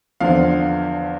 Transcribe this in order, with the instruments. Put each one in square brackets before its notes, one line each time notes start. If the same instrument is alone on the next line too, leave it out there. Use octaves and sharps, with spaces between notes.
[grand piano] E2 D3 F3 F5